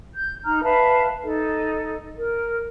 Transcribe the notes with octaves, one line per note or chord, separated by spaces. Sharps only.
G6
D#4 A#5 F6
B4 E5 F5 A5
D#4 A4
A#4